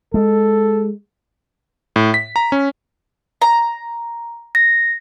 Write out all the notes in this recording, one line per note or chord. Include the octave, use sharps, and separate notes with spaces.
G#3 A4
A2
B6
A#5
C#4
A#5
A#6